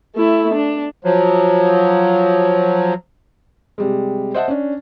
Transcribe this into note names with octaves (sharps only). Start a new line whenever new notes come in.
A3 E4
D4
F3 F#3
C3 G3 G#3
C5 D#5 E5 F#5 A5
C#4 D4